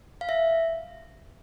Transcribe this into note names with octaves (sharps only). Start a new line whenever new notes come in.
F5
E5